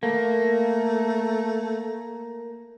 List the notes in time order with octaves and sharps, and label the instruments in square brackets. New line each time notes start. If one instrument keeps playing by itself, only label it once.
[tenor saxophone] A3 [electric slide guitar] A#3